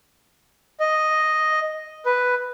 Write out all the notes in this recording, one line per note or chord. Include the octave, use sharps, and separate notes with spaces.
D#5
B4